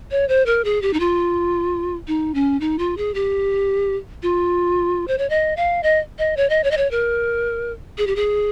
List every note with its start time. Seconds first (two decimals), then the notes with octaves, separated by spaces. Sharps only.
0.11 C#5
0.29 C5
0.46 A#4
0.65 G#4
0.82 G4
0.93 D#4
1.00 F4
2.08 D#4
2.35 C#4
2.60 D#4
2.79 F4
2.97 G#4
3.14 G4
4.23 F4
5.08 C5
5.18 C#5
5.30 D#5
5.57 F5
5.83 D#5
6.19 D#5
6.37 C#5
6.50 D#5
6.64 C#5
6.71 D#5
6.77 C#5
6.91 A#4
7.98 G#4
8.07 G4
8.16 G#4